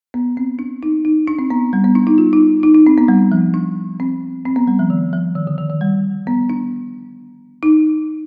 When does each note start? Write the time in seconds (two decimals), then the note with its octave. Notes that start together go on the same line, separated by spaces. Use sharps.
0.14 B3
0.37 C4
0.59 D4
0.83 D#4
1.05 D#4
1.28 D4
1.39 C4
1.50 B3
1.73 G3
1.84 B3
1.95 D4
2.07 D#4
2.18 F4
2.33 D#4
2.63 D#4
2.75 D#4
2.87 C4
2.98 B3
3.08 G3
3.32 F3
3.54 D4
4.00 C4
4.45 C4
4.56 B3
4.68 G3
4.79 F3
4.90 D#3
5.13 F3
5.35 D#3
5.47 D3
5.58 D#3
5.70 D#3
5.81 G3
6.27 B3
6.50 D4
7.63 D#4